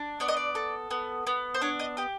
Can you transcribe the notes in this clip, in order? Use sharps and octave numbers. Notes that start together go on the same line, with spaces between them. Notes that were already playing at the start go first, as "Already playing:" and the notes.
Already playing: D4
B3 D5
D#5
D5
A4
B3
B3
C5
D4 C#5
D#5
G4 D#5